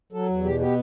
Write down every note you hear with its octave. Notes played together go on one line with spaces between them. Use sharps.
F#3 A4
E2
B2 G4
B3 G4